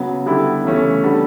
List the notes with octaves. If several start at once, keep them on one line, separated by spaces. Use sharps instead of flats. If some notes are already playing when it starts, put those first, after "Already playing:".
Already playing: C#3 F#3 B3
D3 G3 B3 E4 G4
C#3 E3 A3 C#4
G3 B3 D4 A4